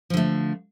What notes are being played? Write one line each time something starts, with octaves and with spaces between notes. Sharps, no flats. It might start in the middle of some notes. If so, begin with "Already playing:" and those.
D3 F3 A3